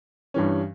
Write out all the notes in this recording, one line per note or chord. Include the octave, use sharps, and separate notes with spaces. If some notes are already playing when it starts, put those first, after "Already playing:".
G2 E3 G3 C#4